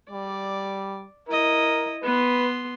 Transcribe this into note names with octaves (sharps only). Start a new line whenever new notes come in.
G3 D5
E4 A#4 D#5
B3 B4 C6